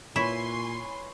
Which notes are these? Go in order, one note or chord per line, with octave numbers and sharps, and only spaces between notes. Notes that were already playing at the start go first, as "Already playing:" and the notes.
A#2 E4 B4 C#5 G#5 C6